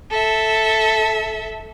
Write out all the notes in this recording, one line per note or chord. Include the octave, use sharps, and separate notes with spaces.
A4 E5